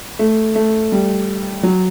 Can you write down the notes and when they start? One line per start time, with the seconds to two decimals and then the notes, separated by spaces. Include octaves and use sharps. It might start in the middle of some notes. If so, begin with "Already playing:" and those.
0.19 A3
0.55 A3
0.92 G3
1.63 F#3